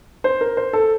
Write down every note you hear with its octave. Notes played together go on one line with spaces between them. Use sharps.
C5
A#4
C5
A4